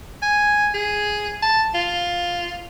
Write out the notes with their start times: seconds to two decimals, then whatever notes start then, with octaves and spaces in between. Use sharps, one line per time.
0.22 G#5
0.74 G#4
1.42 A5
1.74 F4